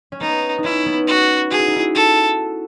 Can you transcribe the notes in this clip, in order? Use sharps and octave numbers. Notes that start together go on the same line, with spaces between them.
C#4
B3 D#4
D#4
C#4 E4
B3
F#4
F#4 G#4
E4
D#4
E4
F#4 A4